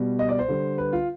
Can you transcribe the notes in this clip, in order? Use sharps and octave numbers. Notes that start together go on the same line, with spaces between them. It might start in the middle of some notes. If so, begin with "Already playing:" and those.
Already playing: B2 G3
D#5
D5
C5
D3 G3
B4
F4